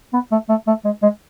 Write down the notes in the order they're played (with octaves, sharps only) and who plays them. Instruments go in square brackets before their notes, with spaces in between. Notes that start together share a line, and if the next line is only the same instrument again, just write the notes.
[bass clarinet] B3
A3
A3
A3
G#3
G#3